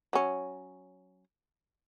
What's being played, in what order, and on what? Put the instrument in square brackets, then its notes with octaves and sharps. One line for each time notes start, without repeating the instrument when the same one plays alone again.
[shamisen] F#3 C#4